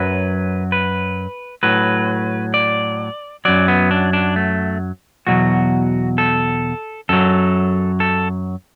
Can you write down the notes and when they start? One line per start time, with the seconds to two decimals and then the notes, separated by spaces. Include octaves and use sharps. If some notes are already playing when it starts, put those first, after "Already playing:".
Already playing: F#2 F#3 B4
0.72 B4
1.63 A2 F#3 B4
2.54 D5
3.45 F#2 F#3 D5
3.68 B3
3.91 D4
4.13 D4
4.36 A3
5.27 E2 B2 F#3 F#4
6.18 A4
7.09 F#2 F#3 A4
8.00 A4